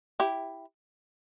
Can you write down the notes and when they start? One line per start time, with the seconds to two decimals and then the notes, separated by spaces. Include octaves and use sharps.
0.20 E4 G4